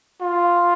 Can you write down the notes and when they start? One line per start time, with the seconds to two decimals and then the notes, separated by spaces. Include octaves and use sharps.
0.21 F4